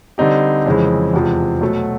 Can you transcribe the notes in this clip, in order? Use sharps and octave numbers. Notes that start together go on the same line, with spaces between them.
D3 G3 C4 D#4 G4
F2 C#3 E3 G#3
E2 C3 F3 G#3
B2 F#3 A3